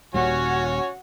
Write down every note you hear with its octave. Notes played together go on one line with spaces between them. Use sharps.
D#1 A#2 G3 C#4 F#4 C#5 F#5